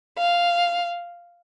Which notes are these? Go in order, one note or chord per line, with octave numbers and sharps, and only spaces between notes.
F5